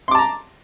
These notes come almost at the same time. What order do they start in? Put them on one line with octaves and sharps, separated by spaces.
C6 D6 A5 A#5